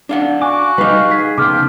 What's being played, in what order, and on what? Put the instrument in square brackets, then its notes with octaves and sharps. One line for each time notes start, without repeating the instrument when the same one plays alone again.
[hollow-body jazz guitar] D4 F5 F#5
[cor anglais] F#4 [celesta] G#5 [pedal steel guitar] D6
[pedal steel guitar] G3 F5 [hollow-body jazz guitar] D#4 B4
[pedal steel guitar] G#4 [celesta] B6
[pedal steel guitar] C#3 B3 G5 [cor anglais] F3 [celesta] D6 F6